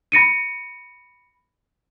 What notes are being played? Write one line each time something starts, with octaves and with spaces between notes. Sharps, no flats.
B5 A#6 C#7 D#7